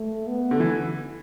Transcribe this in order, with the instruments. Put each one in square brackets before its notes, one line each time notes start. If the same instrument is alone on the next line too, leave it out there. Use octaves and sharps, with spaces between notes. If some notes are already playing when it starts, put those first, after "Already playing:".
Already playing: [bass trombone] A3
B3
[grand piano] D3
E3